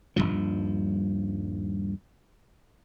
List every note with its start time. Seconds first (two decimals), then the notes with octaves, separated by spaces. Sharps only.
0.16 D#1 E2 G2 F3